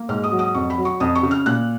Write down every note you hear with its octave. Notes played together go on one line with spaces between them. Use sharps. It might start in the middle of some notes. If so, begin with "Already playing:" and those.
Already playing: A#3
G#2 F6
D#6
F#3
D#6
F2 C#6
B5
F#3
C#6
F2 D#6
C#6
C#3
F6
A#2 F#6